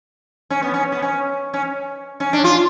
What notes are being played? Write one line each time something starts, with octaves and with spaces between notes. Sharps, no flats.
C#4
B3
C#4
B3
C#4
C#4
C#4
D4
F4